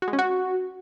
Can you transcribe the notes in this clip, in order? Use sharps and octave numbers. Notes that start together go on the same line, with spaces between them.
F#4
G#3
C#4
F#4